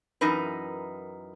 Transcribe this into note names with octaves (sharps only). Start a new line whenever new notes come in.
F#2 E3 D#4 A#4 B4